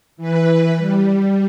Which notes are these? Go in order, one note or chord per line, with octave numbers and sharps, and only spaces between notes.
E3 B4
G3